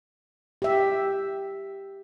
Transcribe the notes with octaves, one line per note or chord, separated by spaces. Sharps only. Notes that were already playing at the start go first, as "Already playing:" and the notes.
G4 E5